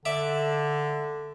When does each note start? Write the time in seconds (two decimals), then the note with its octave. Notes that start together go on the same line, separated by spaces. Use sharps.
0.05 D3 D5 E5 D6